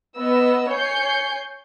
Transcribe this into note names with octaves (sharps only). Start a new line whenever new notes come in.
B3 D#5 E6
C#5 G#5 G6 C7 C#7